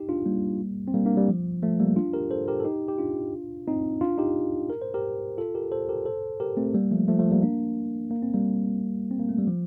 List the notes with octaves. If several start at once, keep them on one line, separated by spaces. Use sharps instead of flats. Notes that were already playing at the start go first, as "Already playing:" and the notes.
Already playing: D#4 G4
D4 F4
G3 A#3
C4
G3 A#3
A#3 D4
G3
F3
F3 A3
G3 A#3
D4 F4
G4 A#4
A4 C5
G4 A#4
A4
D#4 G4
G4
D4 F4
C4 D#4
D4 F4
D#4 G4
A#4
C5
G4 A#4
F4 A4
G4 A#4
A4 C5
G4 A#4
A4 C5
G4 A#4
A3 C4
G3 A#3
F3 A3
F3 A3
F3 A3
G3 A#3
A#3 D4
A#3
C4
G3 A#3
C4
A#3
A3
G3
F3